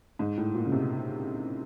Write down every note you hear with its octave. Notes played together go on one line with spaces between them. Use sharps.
G#2
A2
A#2
C#3
C3